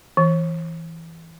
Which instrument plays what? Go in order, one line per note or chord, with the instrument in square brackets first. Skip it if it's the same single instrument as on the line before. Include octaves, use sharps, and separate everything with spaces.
[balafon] E3